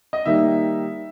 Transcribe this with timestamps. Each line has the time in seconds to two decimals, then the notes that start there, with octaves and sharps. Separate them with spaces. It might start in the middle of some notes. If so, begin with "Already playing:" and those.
0.13 D#5
0.26 D#3 G3 A#3 D#4 E5